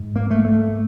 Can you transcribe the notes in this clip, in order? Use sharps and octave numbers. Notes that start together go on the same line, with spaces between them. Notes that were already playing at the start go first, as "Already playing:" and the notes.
Already playing: G#2
A#3
A3
A3